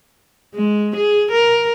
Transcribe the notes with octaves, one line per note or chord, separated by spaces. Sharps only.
G#3
G#4
A#4